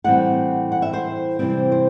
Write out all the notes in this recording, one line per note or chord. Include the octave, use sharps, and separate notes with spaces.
A2 E3 G3 C4 F#5
F#5
E5
C5
C3 E3 G3 C4
C5